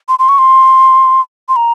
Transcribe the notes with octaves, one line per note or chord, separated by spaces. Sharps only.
C6
C6
C#6
C6
C6
A#5